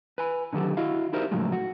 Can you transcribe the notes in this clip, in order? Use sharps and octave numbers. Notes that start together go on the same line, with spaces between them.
B4 G#5 B5
D3 D#3 F#3 G4 A4
E4 F#4 D#5 F5
D#4 E4 G4 A#4 C5
A2 C#3 F3 F#3 G#3 A3
F#4